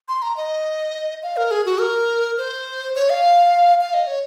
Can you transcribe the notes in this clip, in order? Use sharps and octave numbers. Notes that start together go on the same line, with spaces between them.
C6
A#5
D#5
F5
A#4
G#4
F#4
A#4
C5
C#5
F5
F5
D#5
C#5